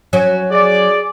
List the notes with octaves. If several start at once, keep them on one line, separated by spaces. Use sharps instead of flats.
F#3 C#4
G#4 D5